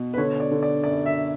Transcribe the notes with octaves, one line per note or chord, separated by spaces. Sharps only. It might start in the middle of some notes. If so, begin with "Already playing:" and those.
Already playing: B2
B4
D3 C#5
D5
D3
D5
F#2 D5
E5